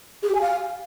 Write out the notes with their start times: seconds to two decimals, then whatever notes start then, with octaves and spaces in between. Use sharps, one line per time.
0.22 G#4
0.28 G4
0.34 G#5
0.40 F5